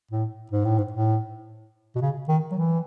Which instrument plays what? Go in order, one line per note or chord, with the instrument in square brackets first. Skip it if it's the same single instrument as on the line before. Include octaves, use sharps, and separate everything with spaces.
[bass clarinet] A2
G#2
A2
G#2
A2
B2
C#3
D#3
F#3
E3